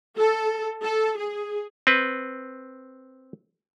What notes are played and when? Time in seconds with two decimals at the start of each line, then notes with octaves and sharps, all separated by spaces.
0.16 A4
0.83 A4
1.18 G#4
1.87 C4 B4